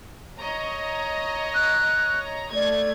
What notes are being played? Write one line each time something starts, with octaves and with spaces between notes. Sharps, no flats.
C#5 D#5 A#5
F#6
A3 D5 G#6